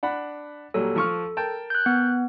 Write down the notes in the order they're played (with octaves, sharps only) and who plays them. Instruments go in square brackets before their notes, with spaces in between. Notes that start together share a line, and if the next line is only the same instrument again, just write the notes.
[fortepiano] D4 F#5 B5
[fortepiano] A#2 F#3 G3 [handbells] A4
[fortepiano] F3 C#6 F6
A#4 G5 A5
[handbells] F#6 G6
B3